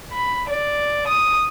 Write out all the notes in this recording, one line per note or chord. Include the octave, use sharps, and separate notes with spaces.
B5
D5
D#6